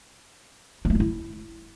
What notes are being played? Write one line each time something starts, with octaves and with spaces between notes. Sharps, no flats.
A#3
A3
G#3
E4